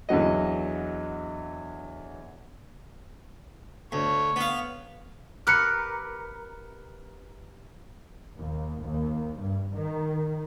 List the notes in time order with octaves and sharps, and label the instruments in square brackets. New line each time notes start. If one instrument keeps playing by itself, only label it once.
[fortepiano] E2 D3 F#3 D#5
[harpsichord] D2 [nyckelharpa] C#5
[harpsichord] B3 F5
[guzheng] G4 A#4 B4 [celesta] F6 F#6 C#7
[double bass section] D#2
D#2
G2
D#3